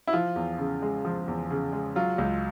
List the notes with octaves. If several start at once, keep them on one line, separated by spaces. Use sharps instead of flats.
E4
F3 F4
E2
C#3
G#3
F3
E2
C#3
G#3
F#3 F4
C#2